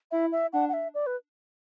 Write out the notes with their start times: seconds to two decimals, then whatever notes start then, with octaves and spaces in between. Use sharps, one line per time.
0.11 E4 E5
0.32 E5
0.53 D4 F#5
0.69 F#5
0.73 E5
0.94 D5
1.07 B4